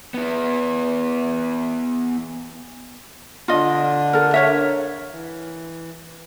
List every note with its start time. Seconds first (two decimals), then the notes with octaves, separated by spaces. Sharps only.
0.14 B3 E4
3.48 D3 D4 F4 D#5
4.13 A4 A#4
4.34 A#4 C#5 E5
5.11 E3